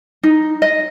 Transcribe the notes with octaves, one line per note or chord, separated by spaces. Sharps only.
D#4
D#5